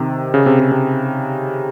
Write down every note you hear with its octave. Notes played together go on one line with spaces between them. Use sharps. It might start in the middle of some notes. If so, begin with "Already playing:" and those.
Already playing: C3 D#3
C#3
C3
C#3
C3